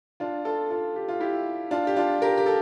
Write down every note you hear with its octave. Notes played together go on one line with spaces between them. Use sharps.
D4 F4
F4 A4
F4 A4
G4
F4
E4 G4
D4 F4
G4
D4 F4
G4 A#4
G4
A4